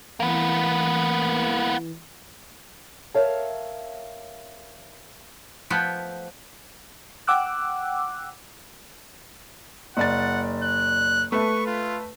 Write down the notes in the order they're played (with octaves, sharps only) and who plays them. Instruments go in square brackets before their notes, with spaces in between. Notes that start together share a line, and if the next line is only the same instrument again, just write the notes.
[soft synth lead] E3 [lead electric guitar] A#3 B3
[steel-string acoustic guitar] A#4 C#5 E5 F5 A5
[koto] F3 A3 B3 G5
[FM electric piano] F#5 G5 D6 E6 F#6
[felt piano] F#1 D5 A6 [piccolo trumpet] F#5
[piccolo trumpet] F#6
[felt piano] A3 B4 A5 [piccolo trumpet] C#6
[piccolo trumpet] F4